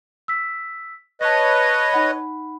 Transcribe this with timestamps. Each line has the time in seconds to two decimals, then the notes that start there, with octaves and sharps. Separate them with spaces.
0.28 E6 B6
1.21 B4 C#5 D#5 A5 A#6
1.92 D#4 F#5 B5